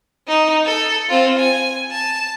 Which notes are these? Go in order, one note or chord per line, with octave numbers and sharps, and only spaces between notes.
D#4
A4
C4 F4
G#5
A5